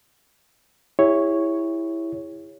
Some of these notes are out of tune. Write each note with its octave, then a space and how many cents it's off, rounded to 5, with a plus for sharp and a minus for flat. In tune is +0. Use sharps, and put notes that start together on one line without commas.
E4 +0 G4 +45 C#5 +0